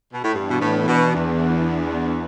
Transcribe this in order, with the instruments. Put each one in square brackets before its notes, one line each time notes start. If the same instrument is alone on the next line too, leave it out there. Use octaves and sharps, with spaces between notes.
[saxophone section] B2
A2
[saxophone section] G2 [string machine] E3 B3 D4
[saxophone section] B2
A2
B2
E2